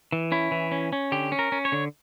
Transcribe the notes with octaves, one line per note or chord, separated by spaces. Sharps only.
E3
C#4 E4
E3
C#4
C#4
D3 G4
C#4
A#4
C#4
C#5
D3